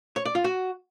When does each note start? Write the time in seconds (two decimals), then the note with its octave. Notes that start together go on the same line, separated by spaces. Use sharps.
0.16 C#5
0.25 D5
0.35 F4
0.44 F#4